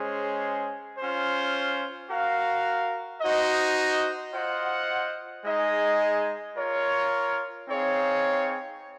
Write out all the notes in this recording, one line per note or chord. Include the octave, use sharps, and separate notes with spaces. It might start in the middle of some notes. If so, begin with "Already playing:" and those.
Already playing: G#3 C#4 G#4 C5
C#4 F4 C5
F#4 A#4 F5
D#4 F#4 C5 D#5
F4 C5 D#5 F#5
G#3 D#4 G#4 D#5
F4 A#4 C#5
C4 D#4 G#4 C#5 F5